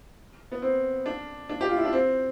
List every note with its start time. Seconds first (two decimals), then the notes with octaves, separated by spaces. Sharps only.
0.52 B3
0.62 C4
1.06 D4
1.49 D4
1.61 G4
1.69 F4
1.77 E4
1.85 D4
1.93 C4